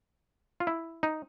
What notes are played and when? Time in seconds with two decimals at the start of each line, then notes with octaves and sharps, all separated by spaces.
0.60 F4
0.67 E4
1.03 D#4